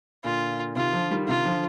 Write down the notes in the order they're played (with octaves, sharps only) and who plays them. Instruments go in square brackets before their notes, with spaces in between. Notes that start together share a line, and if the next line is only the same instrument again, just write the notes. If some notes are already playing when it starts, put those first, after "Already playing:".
[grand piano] A#2 D3 [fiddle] F4
[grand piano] C3 D#3 [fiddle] F4
[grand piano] D3 F3
D#3 G3
D3
[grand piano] C3 D#3 [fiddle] F4
[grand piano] D3 F3